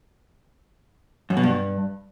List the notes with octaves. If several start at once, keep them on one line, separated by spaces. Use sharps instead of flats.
F#2
B2
G2